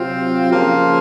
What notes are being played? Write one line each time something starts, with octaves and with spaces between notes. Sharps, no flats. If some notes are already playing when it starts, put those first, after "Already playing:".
Already playing: C3 F#3 C4 F4
C#3 F3 A#3 F4